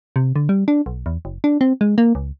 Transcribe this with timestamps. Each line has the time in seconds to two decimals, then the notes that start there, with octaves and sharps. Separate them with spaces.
0.16 C3
0.36 D3
0.49 G3
0.68 D4
0.86 B1
1.06 E2
1.25 F#1
1.44 D4
1.61 C4
1.81 G#3
1.98 A#3
2.15 C#2